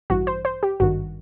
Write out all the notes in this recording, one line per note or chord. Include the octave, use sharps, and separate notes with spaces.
A1 G2 E3 F#4
C5
C5
G4
G#1 G2 D#3 F#4